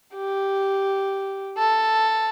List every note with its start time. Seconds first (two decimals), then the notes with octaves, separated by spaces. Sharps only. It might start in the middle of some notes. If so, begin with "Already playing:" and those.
0.15 G4
1.58 A4